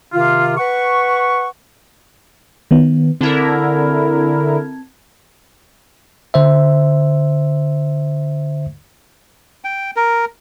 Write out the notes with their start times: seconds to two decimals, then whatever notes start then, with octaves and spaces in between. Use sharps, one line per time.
0.13 C3 D#3 F4
0.58 B4 F#5 C#6
2.71 D#3 B3
3.21 D3 C4 E4 A#4 A5 G#6
6.34 D3 C5 E5
9.64 G5
9.96 A#4